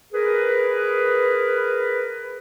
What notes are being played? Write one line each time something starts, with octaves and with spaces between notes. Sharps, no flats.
G#4 A#4 B4